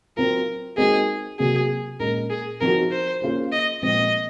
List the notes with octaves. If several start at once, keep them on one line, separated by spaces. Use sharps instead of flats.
F#3 C4 F4 A#4
G#3 C4 D#4 F#4 G#4 A#4
C3 F#3 A#3 G#4
A#2 G#3 C#4 G#4 A#4
G#4
F3 C4 D#4 F#4 A#4
C5
A#3 C#4 F4 G#4 C5
D#5
A#2 F3 G#3 C4 D#5